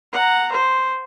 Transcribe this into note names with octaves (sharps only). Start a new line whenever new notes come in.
F#5 A#5
C5